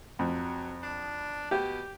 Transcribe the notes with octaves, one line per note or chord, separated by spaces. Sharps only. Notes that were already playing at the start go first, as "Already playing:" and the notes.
F2 F#3
D4
B2 G4